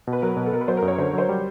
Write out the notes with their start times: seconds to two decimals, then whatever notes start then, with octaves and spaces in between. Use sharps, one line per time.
0.07 B2
0.13 B4
0.22 F#3 A#4
0.37 B2
0.46 A4
0.53 B2 A#4
0.61 B4
0.68 F#3 C5
0.77 A#4
0.82 F#2
0.88 C#5
0.98 D3 C5
1.13 F#3 C5
1.29 G3